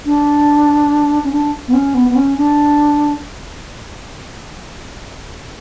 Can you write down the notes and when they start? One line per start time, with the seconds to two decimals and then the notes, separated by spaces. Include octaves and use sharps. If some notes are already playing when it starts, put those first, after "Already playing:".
0.05 D4
1.24 C#4
1.32 D4
1.68 B3
1.73 C#4
1.94 B3
2.09 B3
2.16 C#4
2.37 D4